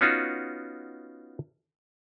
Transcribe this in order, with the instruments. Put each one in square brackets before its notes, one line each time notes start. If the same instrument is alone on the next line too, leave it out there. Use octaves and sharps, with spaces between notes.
[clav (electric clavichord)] B3 C#4 D#4 F4 F#4